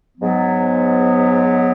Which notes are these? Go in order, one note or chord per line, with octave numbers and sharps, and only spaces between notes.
G#2 F#3 B3